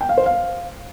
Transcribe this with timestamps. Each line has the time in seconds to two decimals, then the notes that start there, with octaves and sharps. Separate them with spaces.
0.01 G5
0.09 F5
0.18 C5
0.26 F5